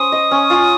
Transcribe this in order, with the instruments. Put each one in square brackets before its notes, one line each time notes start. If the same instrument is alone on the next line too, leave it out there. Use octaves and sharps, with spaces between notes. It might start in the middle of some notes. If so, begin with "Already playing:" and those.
Already playing: [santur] C#4 C5 [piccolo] D#6
[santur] D#5
C#4
F4